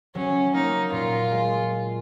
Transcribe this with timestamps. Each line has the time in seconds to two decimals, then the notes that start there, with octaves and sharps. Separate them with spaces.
0.15 F#3 C#4
0.54 A#3 D#4
0.92 A#2 F4
1.31 G#3